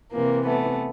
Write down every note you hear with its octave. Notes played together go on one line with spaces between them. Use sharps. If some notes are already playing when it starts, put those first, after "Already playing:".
C3 E3 A#3
A3 B3